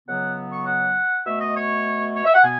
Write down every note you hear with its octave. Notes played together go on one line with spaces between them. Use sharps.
C#2 C#3 F#3 B3 F#5
C#6
F#5
B2 A3 E5
D#5
C#5
C#5
E5
F#5
B2 B3 G#5